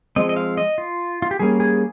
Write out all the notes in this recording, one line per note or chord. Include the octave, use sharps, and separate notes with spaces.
F3 G#3 C4 D#5
D#5
F5
D#5
F4
F4
G4
G3 A#3 C#4 G#4
G#4